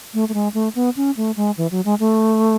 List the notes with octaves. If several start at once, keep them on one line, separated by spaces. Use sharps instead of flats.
A3
A3
G#3
A3
B3
C#4
A3
G#3
E3
F#3
G#3
A3